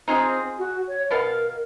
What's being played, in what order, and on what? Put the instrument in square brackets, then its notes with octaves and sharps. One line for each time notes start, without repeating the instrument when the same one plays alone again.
[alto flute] C4 [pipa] D#4 F4 G#4
[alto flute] F#4
C#5
[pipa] B2 B3 F5 [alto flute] A#4